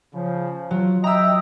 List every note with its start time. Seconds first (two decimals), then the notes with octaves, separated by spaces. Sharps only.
0.13 C#3 F3
0.71 F#3 F4
1.04 D#5 E5 G5 A#5 E6